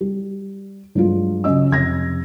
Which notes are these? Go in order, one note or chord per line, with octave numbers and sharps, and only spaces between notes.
G3
G2 F#3 G#3 F4
C#3 F#3 C#4 D#5 E6
F1 G#6 A#6